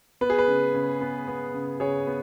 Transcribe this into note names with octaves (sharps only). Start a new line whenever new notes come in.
B3 B4
G#4
B4
C#3
C#3
B3
B3
C#3
C#3 G#4 C#5
B3